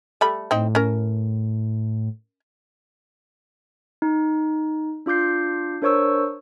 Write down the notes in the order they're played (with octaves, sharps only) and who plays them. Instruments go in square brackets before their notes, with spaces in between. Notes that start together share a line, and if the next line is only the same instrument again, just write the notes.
[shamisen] G3 A3 B5
[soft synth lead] A2 [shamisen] C4 D#4
[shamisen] C#4 A#4
[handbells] D#4
D4 F4 D6 G6 C7
D4 A#4 C5 C#5 C#6 E6